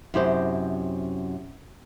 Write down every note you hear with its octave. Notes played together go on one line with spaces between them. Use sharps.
F#2 C3 E4 G4 C5 D#5